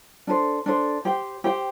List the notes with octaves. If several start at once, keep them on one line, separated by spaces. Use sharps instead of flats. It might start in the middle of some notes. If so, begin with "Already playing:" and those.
D4 A4 C5
D4 A4 C5
G4 C5 G5
G4 C5 G5